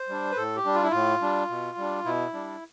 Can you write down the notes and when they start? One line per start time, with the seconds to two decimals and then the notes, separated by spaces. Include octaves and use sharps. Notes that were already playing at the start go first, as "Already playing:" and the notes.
Already playing: C5
0.09 G3 D4
0.31 B4
0.36 A2 A4
0.56 G4
0.65 G3 D4
0.74 F4
0.83 E4
0.91 A2 F4
1.21 G3 D4
1.49 B2
1.78 G3 D4
2.05 B2 E4
2.33 G3 D4